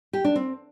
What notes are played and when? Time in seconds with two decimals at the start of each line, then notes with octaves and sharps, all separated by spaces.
0.13 G4
0.24 D4
0.36 C4